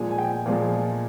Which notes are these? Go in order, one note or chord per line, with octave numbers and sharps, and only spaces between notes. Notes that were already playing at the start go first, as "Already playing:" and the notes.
Already playing: A#2 F3 G#3 G#5
G#5
G5
A#2 F3 G#3 F5